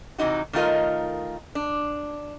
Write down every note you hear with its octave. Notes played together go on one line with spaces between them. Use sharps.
C3 E3 D#4 F#4
D#3 A3 D4 F4 A#4 D#5
D4